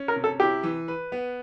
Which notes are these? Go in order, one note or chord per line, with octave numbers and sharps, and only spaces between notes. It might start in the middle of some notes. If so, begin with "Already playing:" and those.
Already playing: C#4
A#4
C3
A4
E4 G4
E3
B4
B3